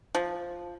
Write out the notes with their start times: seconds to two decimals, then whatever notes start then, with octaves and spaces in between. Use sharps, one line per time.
0.15 F3